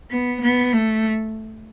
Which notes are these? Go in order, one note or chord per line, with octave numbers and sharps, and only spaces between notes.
B3
B3
A3